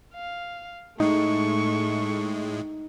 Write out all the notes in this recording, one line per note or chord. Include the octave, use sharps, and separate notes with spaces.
F5
A2 G#3 A3 D#4 C#6